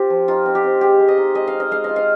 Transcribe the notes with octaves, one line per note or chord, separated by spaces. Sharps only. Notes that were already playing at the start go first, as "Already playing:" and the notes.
Already playing: C4 F4 G4
F3
D#4 F4
C4
G4
C4
G#3 G4
G#3
D#5
D#4
G#3 D#5
F5
D#4
D#5
G#3 F5
F4 D#5
F5